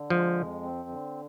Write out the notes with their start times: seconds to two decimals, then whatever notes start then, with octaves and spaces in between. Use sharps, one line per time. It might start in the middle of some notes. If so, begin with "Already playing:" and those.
Already playing: D3
0.10 F3 G#3
0.37 F2
0.63 C4
0.89 D3